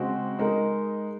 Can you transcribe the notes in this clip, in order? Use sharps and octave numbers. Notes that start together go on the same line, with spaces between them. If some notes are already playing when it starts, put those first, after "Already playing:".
Already playing: C#3 G#3 C4 F#4
G#3 D#4 A#4